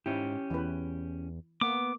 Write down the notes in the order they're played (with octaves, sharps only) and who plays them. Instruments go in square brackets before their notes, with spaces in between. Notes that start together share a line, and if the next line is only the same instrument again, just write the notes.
[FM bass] G#2 [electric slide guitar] C#4 G4 [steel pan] E4
[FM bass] E2 [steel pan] E3 B4
[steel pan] A#3 [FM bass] B3 [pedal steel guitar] D6